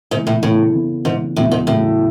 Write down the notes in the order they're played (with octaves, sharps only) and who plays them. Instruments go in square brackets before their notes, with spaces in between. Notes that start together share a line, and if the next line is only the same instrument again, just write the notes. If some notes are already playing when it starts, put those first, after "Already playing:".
[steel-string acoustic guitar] G#2 [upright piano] C#3 E3 B3
[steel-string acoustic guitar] A2
[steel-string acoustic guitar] A2 [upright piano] C#3 E3 B3
[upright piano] C#3 E3 B3
[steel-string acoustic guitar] G#2 [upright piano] C#3 E3 B3
[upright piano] E2 C#3 F#3 [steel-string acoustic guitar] A2
[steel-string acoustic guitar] G#2
[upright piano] E2 C#3 F#3 [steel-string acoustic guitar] A2